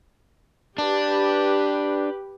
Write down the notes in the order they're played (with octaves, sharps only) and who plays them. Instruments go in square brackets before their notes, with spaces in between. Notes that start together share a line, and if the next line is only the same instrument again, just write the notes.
[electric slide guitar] D4 [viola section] G4 B4